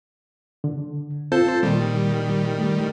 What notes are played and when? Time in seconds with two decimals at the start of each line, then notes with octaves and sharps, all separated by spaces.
0.64 D3
1.32 C4 F4 A4 C5 A5 G6
1.63 A#2 D#3 G3
2.58 A3